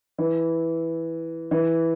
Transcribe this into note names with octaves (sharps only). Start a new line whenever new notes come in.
E3
E3